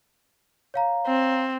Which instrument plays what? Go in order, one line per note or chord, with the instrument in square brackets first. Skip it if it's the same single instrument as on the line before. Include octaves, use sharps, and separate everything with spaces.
[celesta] C#5 F5 A#5
[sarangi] C4